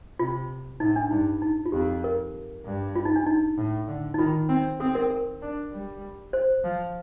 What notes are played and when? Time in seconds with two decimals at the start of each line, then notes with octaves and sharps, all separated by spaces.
0.19 C3 F4
0.80 A2 D#4
0.96 D4
1.11 G2 D#4
1.42 D#4
1.66 F4
1.72 F2 G4
2.04 A#4
2.65 G2
2.96 F4
3.05 D#4
3.16 D4
3.26 D#4
3.57 A2
3.88 D3
4.14 D#4
4.18 D#3 F4
4.49 C4
4.80 C4 A4
4.95 A#4
5.11 A#4
5.42 D4
5.72 G3
6.33 C5
6.64 F3